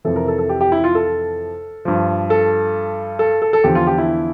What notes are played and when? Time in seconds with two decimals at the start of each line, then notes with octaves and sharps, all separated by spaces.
0.05 F2 C3 E3 A4
0.16 A#4
0.28 A4
0.38 A4
0.49 G4
0.61 G4
0.72 E4
0.84 F4
0.95 A4
1.85 G2 F3
2.30 A4
3.19 A4
3.42 A4
3.53 A4
3.64 E2 D3 F3 G4
3.75 F4
3.87 G4
3.98 E4